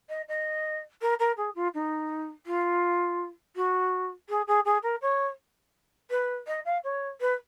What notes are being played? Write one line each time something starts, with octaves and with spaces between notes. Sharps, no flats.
D#5
D#5
A#4
A#4
G#4
F4
D#4
F4
F#4
G#4
G#4
G#4
A#4
C#5
B4
D#5
F5
C#5
B4